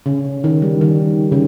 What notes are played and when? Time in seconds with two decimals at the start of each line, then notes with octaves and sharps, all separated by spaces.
0.06 C#3
0.44 D#3
0.62 G3
0.81 D#3
1.32 C#3